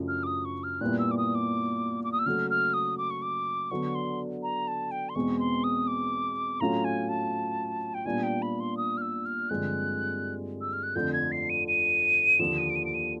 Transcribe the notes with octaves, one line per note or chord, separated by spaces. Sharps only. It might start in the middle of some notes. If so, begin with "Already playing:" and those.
Already playing: F#2 C#3 F3 A3 D4
F6
D6
D#6
C#6
F6
A#2 G3 B3 E4 F#6
E6
D6
D#6
D6
D6
D#6
E6
C#3 F#3 A3 F6
F6
D#6
D6
C#6
D6
D3 F#3 B3 D4 C#6
C6
A#5
A5
G5
C6
E2 B2 G#3 C4 C#6
C6
D#6
D6
A2 F#3 A3 C#4 F4 A#5
G#5
A5
G5
A#2 G3 B3 D4 F4 G#5
G5
B5
C6
D#6
F6
E6
F6
G2 D3 F3 G#3 C4 F#6
E6
F6
F#6
F2 D3 F3 A3 G6
G#6
C7
D#7
D#7
D#2 D3 F3 E7
D#7
D7
D#7
D7
D#7